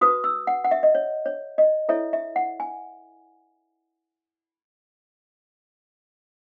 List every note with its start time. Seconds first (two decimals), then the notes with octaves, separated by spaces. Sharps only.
0.01 F#4 B4 D#6
0.24 E6
0.47 F#5
0.64 F#5
0.71 E5
0.83 D#5
0.95 C#5
1.26 C#5
1.58 D#5
1.89 E4 A4 C#5 E5
2.13 E5
2.36 F#5
2.60 G#5